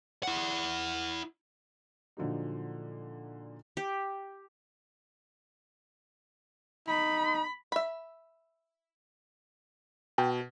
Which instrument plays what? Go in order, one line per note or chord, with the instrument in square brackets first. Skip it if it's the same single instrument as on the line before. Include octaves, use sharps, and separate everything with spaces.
[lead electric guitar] E4 F#5
[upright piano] A#2 D3 F3 F#3 D#4
[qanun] G4
[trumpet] D#4 [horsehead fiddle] B5
[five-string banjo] E5 B5
[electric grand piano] B2 [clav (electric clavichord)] G5